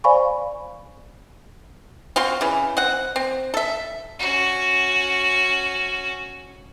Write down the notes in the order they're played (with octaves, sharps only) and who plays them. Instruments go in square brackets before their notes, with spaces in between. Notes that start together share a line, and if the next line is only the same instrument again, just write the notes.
[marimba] C5 D5 F5 G#5 B5 C#6
[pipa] C4 F4 F#4 C6
C#3 E3
C4 F#5
C4
A4 E5
[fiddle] C#4 F#4